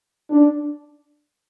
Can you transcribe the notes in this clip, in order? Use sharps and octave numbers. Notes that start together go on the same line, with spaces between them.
D4